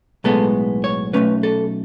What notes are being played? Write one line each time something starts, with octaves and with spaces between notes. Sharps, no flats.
B1 A2 G#3 B3 A4
C#5
B1 B2 A3 C#4 B4
A4